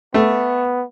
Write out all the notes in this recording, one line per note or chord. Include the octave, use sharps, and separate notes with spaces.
A3 B3